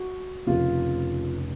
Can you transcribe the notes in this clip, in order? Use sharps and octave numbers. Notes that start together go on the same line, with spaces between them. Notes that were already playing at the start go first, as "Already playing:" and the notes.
Already playing: F#4
F1 F2 C#3 F4